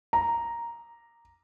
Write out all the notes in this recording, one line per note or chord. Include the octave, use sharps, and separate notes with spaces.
A#5